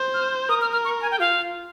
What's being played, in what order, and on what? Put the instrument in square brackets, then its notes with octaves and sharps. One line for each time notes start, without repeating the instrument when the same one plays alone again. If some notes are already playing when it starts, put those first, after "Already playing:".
Already playing: [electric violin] C5
[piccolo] F6
[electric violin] A#4 [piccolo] D#6
[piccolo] F6
F6
C#6
A#5
G#5
G5
[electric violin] F4 [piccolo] F5